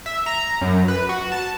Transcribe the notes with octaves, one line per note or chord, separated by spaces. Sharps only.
E5
A#5
F#2
B4
F#4
A5